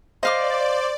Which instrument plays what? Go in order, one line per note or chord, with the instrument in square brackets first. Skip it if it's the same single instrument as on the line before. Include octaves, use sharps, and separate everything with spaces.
[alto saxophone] C5 [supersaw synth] D5 [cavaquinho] D#5 F5 D6